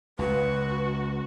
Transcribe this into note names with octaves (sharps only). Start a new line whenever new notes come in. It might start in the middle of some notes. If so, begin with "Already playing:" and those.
C#2 F#4 B4